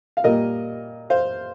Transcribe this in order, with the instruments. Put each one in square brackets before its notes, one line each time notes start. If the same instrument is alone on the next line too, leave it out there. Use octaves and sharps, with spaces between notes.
[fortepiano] F5
A#2 G3 A#3 A#4 D#5
C5 F5